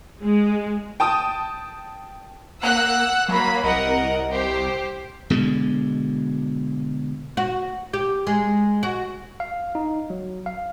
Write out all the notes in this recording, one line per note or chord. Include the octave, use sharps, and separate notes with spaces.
G#3
G5 A5 D#6
A#3 F#5 E6 F#6
F#3 A#3 B5
C2 A#4 D#5 F#5
G4 C5
B2 D3 G#3
F#4
G4
G#3
F#4
F5
D#4
F#3
F5